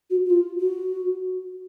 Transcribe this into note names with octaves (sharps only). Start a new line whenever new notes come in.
F#4
F#4
F4
F#4